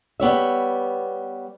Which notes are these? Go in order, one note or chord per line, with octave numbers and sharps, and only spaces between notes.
G3 B3 C#5 E5